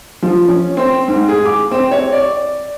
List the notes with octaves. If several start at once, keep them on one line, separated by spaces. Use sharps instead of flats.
F3
C#4
C4
G#2
G#4
D6
C4
C#5
D5